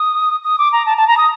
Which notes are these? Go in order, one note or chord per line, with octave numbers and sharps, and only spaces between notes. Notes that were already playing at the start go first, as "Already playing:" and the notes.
Already playing: D#6
D#6
D6
A#5
A5
A5
A#5
D#6